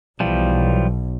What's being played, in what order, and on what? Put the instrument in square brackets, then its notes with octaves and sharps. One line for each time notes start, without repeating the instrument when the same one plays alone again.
[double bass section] B1 [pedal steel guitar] E3 F3 G3